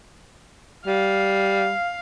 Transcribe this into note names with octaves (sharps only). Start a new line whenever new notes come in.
G3 F5